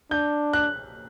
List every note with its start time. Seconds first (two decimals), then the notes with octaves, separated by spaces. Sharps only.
0.11 D4 G6
0.53 F#6